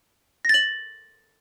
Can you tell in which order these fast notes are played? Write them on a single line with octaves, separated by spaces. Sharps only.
A#6 A6 F#7